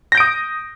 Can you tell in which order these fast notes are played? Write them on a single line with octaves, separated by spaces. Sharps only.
A#6 G6 D7 D#6